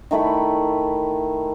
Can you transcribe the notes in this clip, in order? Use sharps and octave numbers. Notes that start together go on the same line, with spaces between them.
D#3 A3 E4 B5